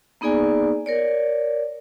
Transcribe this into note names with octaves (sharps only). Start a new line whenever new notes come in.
A#3 B3 D#4 G#4 D5 G#5
A#4 C#5 D5